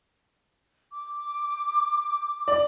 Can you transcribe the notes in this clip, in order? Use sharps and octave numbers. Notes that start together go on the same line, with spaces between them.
D6
D5